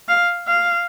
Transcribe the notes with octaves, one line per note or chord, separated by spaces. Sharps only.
F5
F5